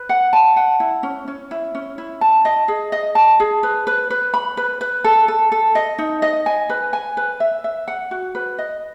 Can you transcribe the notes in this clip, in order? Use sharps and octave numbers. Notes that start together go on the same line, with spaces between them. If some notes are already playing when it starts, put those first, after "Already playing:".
Already playing: B4
F#5
A5
F#5
E4
C#4
C#4
E4
C#4
E4
A5
D#5
G#4
D#5
A5
G#4
B4
B4
B4
B5
B4
B4
A4
A4
A4
D#5
D#4
D#5
G#5
B4
G#5
B4
E5
E5
F#5
F#4
B4
D#5